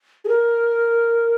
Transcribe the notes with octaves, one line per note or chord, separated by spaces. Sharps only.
G#4
A#4